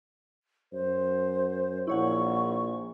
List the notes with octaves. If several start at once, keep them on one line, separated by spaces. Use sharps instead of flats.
F#2 C5
A#1 E4 C#5 F#5 C#6